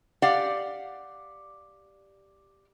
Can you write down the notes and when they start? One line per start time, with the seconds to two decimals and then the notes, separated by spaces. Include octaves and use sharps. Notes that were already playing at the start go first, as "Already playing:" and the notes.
0.22 G4 D5 F5 F#5